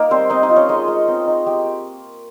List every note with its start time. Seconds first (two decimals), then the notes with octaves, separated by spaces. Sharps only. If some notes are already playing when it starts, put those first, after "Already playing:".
Already playing: A#3 D#4 A#4
0.11 G3 C4 C5
0.30 C4 D#4 D#5
0.43 D#4 D#5
0.49 F4
0.56 C#4 C#5
0.69 G#3 D#4 D#5
0.88 G#3
1.08 C4
1.28 D#4
1.46 G#3 G4